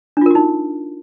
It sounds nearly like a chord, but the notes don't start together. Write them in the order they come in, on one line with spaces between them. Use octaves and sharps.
D4 F4 A#4 F#4 D#4